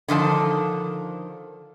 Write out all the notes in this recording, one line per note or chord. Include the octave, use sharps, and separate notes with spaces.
D3 D#3 F3 A5